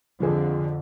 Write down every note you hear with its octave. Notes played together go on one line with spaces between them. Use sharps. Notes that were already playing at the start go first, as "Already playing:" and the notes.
F2 D3 F3 G#4